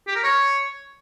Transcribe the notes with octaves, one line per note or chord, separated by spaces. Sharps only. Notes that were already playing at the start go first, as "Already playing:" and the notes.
G4
A#4
C#5